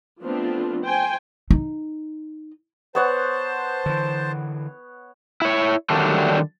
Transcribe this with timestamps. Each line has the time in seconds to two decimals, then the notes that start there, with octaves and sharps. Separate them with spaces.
0.22 F3 A3 B3 C4 D4 F4
0.83 C5 G5 G#5
1.51 D#4
2.95 B3 C5 C#5 F#5 A5
3.86 D3 E3
5.42 E4 C#5
5.90 D3 D#3 F#3 G3 A3 D4